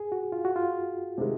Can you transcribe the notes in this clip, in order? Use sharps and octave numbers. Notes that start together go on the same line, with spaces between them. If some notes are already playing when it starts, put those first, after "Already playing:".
Already playing: G#4
F#4
F4
F#4
F4
C3 D#3 G#3